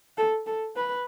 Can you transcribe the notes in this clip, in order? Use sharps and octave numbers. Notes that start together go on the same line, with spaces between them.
A4
A4
B4